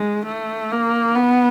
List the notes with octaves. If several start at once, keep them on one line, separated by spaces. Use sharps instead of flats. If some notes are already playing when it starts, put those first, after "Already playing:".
Already playing: G#3
A3
A#3
B3